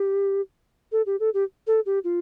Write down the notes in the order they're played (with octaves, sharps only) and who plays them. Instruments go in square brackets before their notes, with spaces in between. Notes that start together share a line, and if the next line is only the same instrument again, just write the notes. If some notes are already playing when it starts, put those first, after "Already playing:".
Already playing: [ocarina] G4
A4
G4
A4
G4
A4
G4
F4